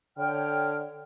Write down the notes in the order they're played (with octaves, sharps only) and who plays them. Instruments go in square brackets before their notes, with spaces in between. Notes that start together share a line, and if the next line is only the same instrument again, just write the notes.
[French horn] D3 [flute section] C#5 G5 F6